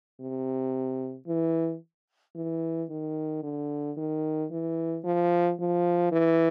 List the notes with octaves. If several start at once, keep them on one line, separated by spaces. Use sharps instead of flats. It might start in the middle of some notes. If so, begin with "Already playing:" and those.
C3
E3
E3
D#3
D3
D#3
E3
F3
F3
E3